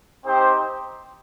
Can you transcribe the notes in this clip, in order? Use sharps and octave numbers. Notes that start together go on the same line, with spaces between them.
C4 D#4 G4 C5